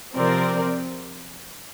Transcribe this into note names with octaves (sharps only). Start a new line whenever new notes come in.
C3 F3 C4 A#4 D5